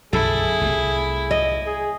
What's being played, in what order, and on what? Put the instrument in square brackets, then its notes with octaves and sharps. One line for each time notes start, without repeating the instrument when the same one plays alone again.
[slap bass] B1 F#2 D3 [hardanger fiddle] E4 [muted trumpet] G#4 [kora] A4
[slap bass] C2 C3 A3
[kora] D#5
[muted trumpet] G#4